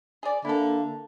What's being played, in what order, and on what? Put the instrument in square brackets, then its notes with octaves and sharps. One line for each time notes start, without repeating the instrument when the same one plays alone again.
[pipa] G#4 D5
[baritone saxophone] D3 [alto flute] A#3 [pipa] E4 A4